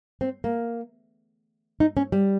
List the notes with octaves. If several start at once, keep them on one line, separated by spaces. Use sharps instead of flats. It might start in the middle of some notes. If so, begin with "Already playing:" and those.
C4
A#3
D#4
C#4
G3